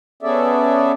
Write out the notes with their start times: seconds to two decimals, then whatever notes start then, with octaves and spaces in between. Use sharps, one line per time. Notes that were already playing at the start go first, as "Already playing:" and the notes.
0.23 B3 C#4 G#4 A4 D5 E5